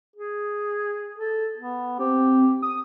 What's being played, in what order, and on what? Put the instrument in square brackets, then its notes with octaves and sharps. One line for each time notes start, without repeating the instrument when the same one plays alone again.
[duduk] G#4
A4
B3
[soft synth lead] C4 [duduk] G4
[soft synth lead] D#6